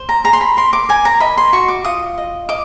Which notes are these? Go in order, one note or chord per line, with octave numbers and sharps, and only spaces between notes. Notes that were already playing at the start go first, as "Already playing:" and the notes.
Already playing: C5
A#5
G#4 A#5
C6
B5
A#4 C6
D6
A#4 G#5
A#5
D#5 B5
C6
F#4 C#6
D6
F4 D#6
D#5
D#5 D6